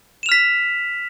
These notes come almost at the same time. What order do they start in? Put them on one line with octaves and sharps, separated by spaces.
E7 F7 F6 B6